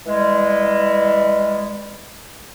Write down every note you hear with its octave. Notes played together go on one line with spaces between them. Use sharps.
E3 G3 G#3